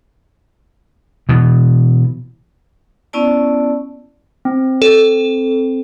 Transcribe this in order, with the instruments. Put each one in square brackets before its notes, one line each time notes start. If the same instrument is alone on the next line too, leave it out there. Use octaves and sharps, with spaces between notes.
[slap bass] B2 E3
[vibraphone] B3 C#4 E4 D5 A5
[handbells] C4
[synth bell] A4